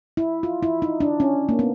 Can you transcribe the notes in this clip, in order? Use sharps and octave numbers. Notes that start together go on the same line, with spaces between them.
E4
F4
E4
D#4
D4
C#4
A#3
B3